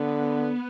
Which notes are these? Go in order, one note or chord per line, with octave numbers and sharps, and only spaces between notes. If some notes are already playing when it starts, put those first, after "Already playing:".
Already playing: D3 B3